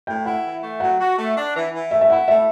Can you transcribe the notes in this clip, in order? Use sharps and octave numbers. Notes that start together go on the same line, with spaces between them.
A2 G5
E4 F#5
E3
A3
F#3 F#5
F#4
A3
D4
E3
E3
A3 E5
E5
E4 F#5
A3 E5